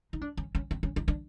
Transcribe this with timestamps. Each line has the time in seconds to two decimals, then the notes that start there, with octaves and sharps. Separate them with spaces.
0.13 D#4
0.21 D4
0.37 C#4
0.55 C#4
0.71 C4
0.83 C#4
0.96 D#4
1.08 D4